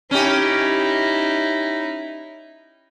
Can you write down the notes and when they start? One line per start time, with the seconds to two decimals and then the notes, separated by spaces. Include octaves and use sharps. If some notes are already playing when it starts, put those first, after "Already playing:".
0.11 C#4 D#4 E4 G4